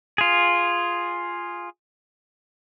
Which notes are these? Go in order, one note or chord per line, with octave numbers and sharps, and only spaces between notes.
F4 G#4